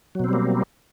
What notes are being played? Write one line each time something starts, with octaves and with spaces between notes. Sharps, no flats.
B2 F#3 G3 A#3 C4